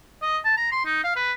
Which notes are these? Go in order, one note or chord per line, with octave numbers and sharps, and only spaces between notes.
D#5
A5
A#5
C6
D#4
F5
B4